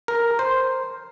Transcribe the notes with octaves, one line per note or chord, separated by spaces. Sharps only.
A#4
C5